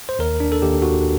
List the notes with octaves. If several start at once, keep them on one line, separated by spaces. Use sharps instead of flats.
C5
D#2 A#4
D4
A4
D#2 G4
F#4